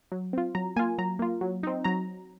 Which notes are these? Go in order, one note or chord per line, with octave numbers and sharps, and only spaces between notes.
F#3
C4 F4
F#3 A#5
A#3 F4 G#5
F#3 A#5
A#3 F4
F#3
C4 D#4
F#3 A#5